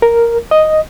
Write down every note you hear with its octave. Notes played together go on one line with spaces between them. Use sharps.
A#4
D#5